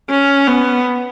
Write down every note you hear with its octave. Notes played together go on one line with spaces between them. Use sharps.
C#4
B3